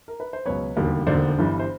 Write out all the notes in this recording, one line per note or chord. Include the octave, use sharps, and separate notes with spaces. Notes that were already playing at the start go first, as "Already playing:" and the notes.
A#4
B4
C5
C#2 B2 F#3 B4 C#5
E1 D#2 D3 G3
E1 D#2 D3 C5 D5
G1 G2 E3 G3
C5